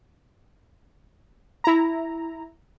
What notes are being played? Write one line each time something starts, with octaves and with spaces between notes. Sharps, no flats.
E4 A#5